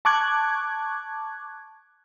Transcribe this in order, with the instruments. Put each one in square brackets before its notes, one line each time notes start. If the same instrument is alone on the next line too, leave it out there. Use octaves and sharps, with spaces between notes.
[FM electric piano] A5 C#6 D6 F#6 G#6